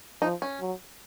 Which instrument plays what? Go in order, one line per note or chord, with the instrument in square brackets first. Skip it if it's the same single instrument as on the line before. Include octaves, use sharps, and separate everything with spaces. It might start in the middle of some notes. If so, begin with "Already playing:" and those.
[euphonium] F3 [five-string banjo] D#4
[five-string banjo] C#4
[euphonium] F#3